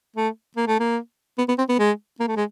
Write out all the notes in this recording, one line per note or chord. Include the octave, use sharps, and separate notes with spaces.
A3
A#3
A3
A#3
B3
B3
C4
B3
G#3
A#3
A3
G#3